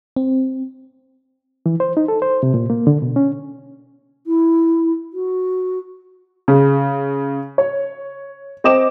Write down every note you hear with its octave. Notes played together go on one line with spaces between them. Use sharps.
C4
E3
C5
D#4
A4
C5
C3
A#2
A#3
D3
B2
C#4
E4
F#4
C#3
C#5
C4 D#5 D6 E7